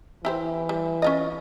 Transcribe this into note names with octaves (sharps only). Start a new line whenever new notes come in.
E3 E4 G4 C5
G3
C#4 F4 D#5